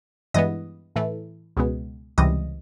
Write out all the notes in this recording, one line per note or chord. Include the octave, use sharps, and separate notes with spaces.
G2 E3 G#3 B3 D#5
A2 E3 A3
C#2 B2 G#3 B3
C#2 C3 E3 G3 D#5